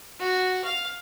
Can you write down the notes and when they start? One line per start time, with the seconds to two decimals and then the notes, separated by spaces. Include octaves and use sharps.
0.20 F#4
0.64 F5